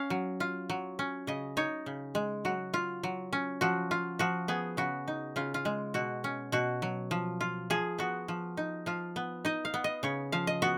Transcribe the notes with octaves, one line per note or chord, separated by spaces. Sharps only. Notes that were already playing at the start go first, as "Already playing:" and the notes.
Already playing: C#4 F5
F#3
F4
F#3
C#4
C#3 D#5
D#4 C#5
C#3
G#3
F#3 F#4
F4
F#3
C#4
F3 F#4
F4
F3 F#4
B3 G#4
C#3 F#4
D#4
C#3 F4
F4
G#3
B2 F#4
C#4
B2 F#4
F#3
F3
F4
F3 G#4
B3 F#4
F3
D#4
F3 F4
B3
D#4 D#5
F5
B3
D#5
C#3 C#5
F3 F5
D#5
B3 F#4